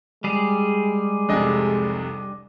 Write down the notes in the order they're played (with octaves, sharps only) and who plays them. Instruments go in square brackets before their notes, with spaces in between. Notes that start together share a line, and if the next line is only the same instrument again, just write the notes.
[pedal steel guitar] G3 G#4 [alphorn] G#3
[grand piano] F1 C2 C3 [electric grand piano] D4 D#5 G#5